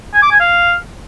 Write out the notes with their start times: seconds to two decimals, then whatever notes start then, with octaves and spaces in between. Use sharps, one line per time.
0.14 G#5
0.22 D6
0.31 G#5
0.40 F5